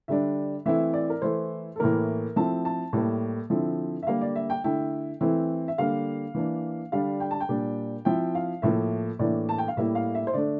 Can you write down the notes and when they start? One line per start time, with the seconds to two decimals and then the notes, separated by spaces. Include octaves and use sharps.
0.08 D3 G3 D4 E5
0.66 E3 A3 C4 E4 E5
0.94 D5
1.10 A#4
1.22 E3 A3 E4 C5
1.76 A4
1.79 A2 E3 A#3 A#4
2.36 F3 A3 C4 E4 A5
2.65 A5
2.93 A2 G3 A#3
3.50 D3 F3 C4 E4
4.03 E5
4.07 D3 G3 A#3 F5
4.21 D5
4.36 E5
4.50 G5
4.64 D3 A3 E4 G5
5.21 E3 A3 C4 E4
5.68 E5
5.78 D3 G3 A#3 F5
6.35 E3 A#3 D4
6.92 D3 G3 D4 F5
7.20 G5
7.31 A5
7.40 G5
7.49 A#2 G3 D4
8.05 F3 C4 E4 G5
8.35 F5
8.62 A2 F3 A#3 E5
9.19 A2 E3 A#3 D4 D5
9.49 A5
9.58 G5
9.68 F5
9.77 A2 G3 A#3 E4 E5
9.95 F5
10.15 E5
10.27 C5
10.34 D3 A3 D4 D5